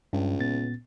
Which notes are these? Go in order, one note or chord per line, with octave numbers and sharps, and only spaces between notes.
C#2 G2
A#2 B3 A6